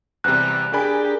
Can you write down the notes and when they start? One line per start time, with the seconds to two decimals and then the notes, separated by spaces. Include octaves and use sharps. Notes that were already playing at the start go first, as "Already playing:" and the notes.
0.24 E2 C3 G3 F#6
0.73 D4 G4 G#4 A#4 D5 G#5 B5